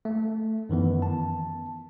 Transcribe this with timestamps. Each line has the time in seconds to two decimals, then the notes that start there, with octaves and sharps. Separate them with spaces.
0.05 A3
0.69 F#2 D#3 E3 B3
1.02 A5